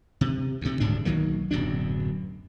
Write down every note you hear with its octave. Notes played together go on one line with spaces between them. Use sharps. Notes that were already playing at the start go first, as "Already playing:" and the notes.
C3
D2 C3
D#1 D2 G#2 D4
B1 D#3 F#3 A#3
D1 F#2 B2 D4